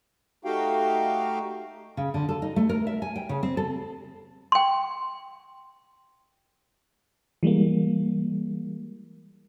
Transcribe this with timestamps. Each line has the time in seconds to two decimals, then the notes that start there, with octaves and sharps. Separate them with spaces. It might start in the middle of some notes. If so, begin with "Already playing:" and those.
0.45 A3 D#4 F#4 G4 F5 G5
1.97 C#3
2.14 D3
2.29 A4
2.42 D#4
2.56 A3
2.69 A#4
2.87 E5
3.02 G#5
3.16 G5
3.29 C#3
3.43 C4
3.57 A4
4.52 G5 C6
7.43 E3 G3 G#3 A#3